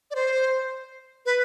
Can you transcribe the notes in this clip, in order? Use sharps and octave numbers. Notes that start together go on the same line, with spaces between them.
D5
C5
B4